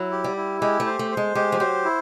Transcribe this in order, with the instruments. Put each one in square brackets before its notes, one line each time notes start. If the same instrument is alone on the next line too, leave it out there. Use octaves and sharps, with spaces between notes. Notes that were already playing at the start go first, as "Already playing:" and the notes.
Already playing: [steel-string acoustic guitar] F#3 [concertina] E4
[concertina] G4
[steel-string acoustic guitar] G3
[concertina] E4
[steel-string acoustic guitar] G#3 [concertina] G4
[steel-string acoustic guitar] A3
[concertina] C5
[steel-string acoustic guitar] A3
[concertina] C5
[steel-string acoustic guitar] G#3
[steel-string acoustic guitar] G#3 [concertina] G4
[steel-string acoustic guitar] F3
[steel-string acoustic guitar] F#3 [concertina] C5
[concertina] E4